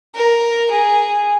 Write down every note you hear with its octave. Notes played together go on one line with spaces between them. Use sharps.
A#4
G#4